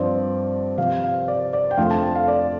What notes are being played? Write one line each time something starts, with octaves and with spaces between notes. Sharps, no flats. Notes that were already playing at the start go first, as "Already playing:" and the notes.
Already playing: G2 F3 C4 D5
C3 F3 C4 F5
F5
D5
D5
G5
F2 F3 A3 D4 F5
A5
F5
D5